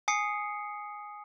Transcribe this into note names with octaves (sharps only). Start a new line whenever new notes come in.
G#5 D#6 C7 C#7